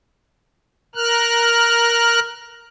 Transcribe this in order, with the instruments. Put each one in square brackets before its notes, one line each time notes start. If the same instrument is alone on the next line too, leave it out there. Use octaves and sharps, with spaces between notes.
[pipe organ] A#4 F6 F#6